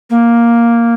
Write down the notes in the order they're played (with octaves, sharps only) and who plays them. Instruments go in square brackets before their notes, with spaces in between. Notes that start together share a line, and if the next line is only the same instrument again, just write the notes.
[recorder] A#3